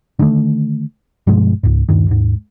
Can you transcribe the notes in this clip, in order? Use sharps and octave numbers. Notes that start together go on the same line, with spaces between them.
D3 D#3 G#3 A3
G2 B2 F3 G#3
C#2 G#2
D#1 G2 D#3
D#2 G#2